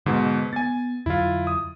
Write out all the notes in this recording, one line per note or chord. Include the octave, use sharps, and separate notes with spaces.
G#2 B2 D3
B3 G#5 A6
F2 D3 F#3 E4 F4
D#6